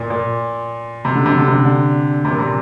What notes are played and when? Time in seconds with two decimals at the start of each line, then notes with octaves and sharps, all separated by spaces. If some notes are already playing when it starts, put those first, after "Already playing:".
Already playing: A#2
0.10 A#2
1.05 C3
1.15 D3
1.26 C3
1.37 D3
1.48 C3
1.65 D3
2.25 C3
2.31 A#2
2.39 C3